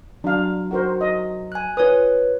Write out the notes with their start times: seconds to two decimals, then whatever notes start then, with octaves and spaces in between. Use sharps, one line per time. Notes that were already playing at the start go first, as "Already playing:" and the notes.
0.24 F#3 D4 F5
0.71 F#4 A#4 C5
1.01 D#5
1.52 G#5 F#6
1.77 F4 B4 C#5 D#6